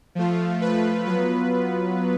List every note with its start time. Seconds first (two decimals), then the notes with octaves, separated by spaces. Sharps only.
0.15 F3 A3 F4
0.62 B4
1.07 F#3 B3 F4 B4
1.53 B4